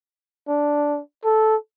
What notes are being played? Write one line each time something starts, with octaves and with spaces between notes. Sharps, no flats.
D4
A4